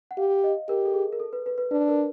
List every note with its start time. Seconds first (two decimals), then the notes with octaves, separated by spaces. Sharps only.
0.11 F#5
0.17 G4 F5
0.44 D#5
0.69 G4 A#4
0.86 A4
0.94 G#4
1.13 A#4
1.20 A4
1.33 B4
1.46 B4
1.58 B4
1.71 D4 B4
1.89 A#4